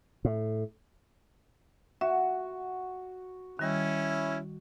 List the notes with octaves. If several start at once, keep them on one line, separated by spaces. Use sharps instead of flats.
A2
F#4 E5
D#3 G3 C#4 E4